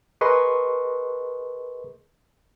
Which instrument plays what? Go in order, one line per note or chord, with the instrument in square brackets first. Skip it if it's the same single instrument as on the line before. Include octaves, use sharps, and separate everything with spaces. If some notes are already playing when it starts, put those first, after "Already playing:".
[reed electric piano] G#4 A#4 B4 D#5 C6 C#6